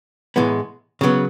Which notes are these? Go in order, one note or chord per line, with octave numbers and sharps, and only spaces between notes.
A2 E3 G#3 B3
C#3 F#3 B3